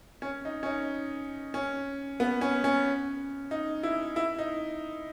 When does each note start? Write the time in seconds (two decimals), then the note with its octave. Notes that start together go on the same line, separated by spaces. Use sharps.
0.22 C#4
0.45 D#4
0.63 C#4
0.66 D#4
1.54 C#4
2.20 B3
2.41 C#4
2.64 C#4
3.51 D#4
3.83 E4
4.16 E4
4.38 D#4